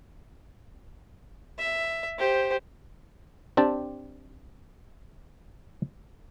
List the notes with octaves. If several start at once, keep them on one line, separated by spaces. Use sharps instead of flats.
E5
G4 C5
C4 D4 G4 A5